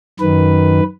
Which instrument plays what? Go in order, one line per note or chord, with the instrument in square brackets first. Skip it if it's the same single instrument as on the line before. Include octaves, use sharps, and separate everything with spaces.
[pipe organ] F#2 D#3 B4